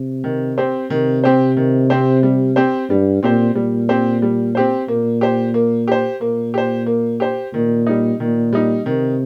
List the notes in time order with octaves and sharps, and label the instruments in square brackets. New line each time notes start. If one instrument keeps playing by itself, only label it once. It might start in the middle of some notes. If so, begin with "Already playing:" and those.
Already playing: [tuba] C3
[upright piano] D#3
C4 G4 C5
[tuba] C3 [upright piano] D#3
[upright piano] C4 G4 C5
D#3
C4 G4 C5
G3
C4 G4 C5
[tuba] G2 [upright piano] G3
[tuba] A#2 [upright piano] C4 G4 C5
[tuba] A#2 [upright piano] G3
[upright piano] C4 G4 C5
G3
C4 G4 C5
[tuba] A#2 [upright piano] A#3
[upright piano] G4 C5
A#3
G4 C5
[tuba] A#2 [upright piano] A#3
[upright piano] G4 C5
A#3
G4 C5
[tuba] A#2 [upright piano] D#3
[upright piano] G3 D#4
[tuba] A#2 [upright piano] D#3
[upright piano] G3 D#4
[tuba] C3 [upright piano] D#3